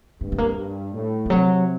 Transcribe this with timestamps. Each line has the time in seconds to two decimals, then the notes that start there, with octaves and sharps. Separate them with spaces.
0.21 G2 A3
0.32 A3
0.38 A#3
0.57 G2
0.94 A2
1.26 D#3
1.30 C3 F#3